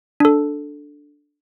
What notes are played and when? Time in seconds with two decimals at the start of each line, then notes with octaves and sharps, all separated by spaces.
0.20 D4 A4